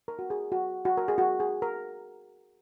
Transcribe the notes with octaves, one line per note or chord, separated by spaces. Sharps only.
A#4
F#4
G#4
F#4
F#4
A#4
G#4
F#4
G#4
A#4